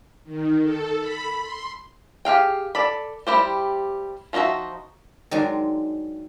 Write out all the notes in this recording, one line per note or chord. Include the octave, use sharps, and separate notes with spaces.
D#3
A4
B5
C6
G4 G#4 F5 G5
A4 D5 B5
G3 E4 F4 G4 C5
F3 C#4 D#4 F#4 E5
D#3 F#3 G#3 D4 A#5 C6